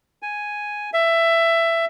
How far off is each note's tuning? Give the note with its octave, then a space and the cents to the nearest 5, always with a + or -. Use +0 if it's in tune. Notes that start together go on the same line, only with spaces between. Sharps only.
G#5 +0
E5 +15